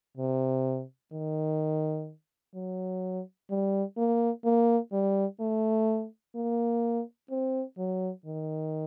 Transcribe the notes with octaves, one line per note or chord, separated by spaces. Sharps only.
C3
D#3
F#3
G3
A#3
A#3
G3
A3
A#3
C4
F#3
D#3